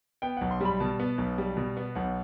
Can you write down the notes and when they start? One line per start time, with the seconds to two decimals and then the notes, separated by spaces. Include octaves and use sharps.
0.22 B3 G5
0.37 B1 F#5
0.51 C6
0.61 G3 B5
0.80 B2 A5
0.99 B3
1.18 B1
1.38 G3
1.57 B2
1.77 B3
1.95 B1 F#5